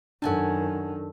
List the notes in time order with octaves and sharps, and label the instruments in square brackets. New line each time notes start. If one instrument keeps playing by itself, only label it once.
[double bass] F#2 D#3 [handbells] D4 A4 [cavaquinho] F#5 G#5 A5